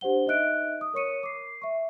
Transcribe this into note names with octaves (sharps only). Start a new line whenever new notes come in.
D4 G4 C5 F#5 G7
D#4 D#5 E5 F#6 D7
D#6
A#4 C#5 C#6 C#7 D#7
D6 C7
E5 C#6